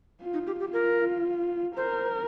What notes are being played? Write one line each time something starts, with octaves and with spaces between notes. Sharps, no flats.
F4
D#4
G4
G4
F4 A#4
A#4 C5